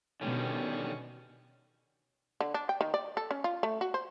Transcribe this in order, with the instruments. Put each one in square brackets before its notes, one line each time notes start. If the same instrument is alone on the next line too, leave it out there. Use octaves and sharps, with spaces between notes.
[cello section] B2 [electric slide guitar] D3 D#3 G3 [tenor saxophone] C#4
[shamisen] D3
D4
G5
D#3
D5
A4
C#4
F4
A3
F#4
C5